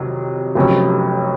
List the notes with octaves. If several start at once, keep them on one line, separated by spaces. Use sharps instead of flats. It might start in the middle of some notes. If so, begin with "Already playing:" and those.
Already playing: F2 C3 D#3 F#3
F1 F2 C3 F#3 C#4